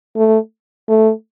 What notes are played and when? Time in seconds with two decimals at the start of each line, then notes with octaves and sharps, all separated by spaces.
0.16 A3
0.89 A3